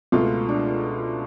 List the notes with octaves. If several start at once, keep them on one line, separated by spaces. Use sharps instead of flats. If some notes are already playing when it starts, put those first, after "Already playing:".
C#2 B2 A3 F4
D4